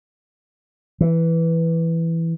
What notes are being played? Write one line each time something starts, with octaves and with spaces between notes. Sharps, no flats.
E3